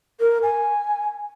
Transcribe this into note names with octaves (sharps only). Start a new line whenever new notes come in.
A#4
G#5